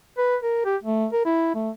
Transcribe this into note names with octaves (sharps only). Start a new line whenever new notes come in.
B4
A#4
G4
A3
A#4
E4
A3